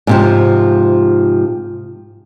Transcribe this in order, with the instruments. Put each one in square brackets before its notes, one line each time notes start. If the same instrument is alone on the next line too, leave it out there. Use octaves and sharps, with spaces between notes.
[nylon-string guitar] G#2 C3 F3